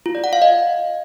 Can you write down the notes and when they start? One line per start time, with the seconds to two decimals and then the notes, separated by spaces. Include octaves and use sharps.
0.06 F4
0.15 D5
0.24 F#5
0.33 F5
0.42 D#5